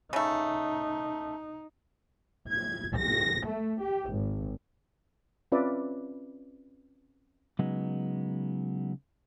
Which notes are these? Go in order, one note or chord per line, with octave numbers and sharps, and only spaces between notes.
C#3 A3 D#4
G#6
A#6
A3
G4
G#1
C4 C#4 F4 B4 D5 E5
C#3 F#3 G#3 B3 D#4